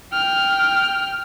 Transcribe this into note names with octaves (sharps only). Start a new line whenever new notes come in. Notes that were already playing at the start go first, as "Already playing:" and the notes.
G5 F6